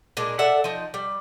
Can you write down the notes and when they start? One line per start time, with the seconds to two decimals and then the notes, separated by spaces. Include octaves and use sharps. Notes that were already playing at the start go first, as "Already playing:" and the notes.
0.17 A#2 G#3 D4
0.39 A4 D5 E5 F#5
0.64 F3 D#4
0.94 G3